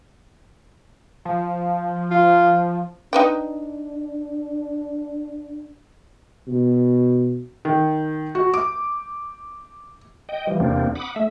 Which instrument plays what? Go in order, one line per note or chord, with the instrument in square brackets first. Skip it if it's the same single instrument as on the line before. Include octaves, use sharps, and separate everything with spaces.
[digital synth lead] F3
[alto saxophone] F4
[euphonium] D4 [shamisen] D#4 B4 G5
[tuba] B2
[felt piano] D#3
F#4
D6
[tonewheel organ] D#5 G5
E3 F3 G3
E2 C3 A#3 C4 D4
F#5 B5 D6 D#6
A3 E5